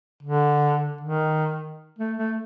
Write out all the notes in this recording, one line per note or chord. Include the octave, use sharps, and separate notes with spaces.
D3
D#3
A3
A3